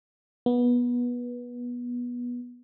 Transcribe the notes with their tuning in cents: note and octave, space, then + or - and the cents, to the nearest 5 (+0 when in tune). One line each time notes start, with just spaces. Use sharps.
B3 -20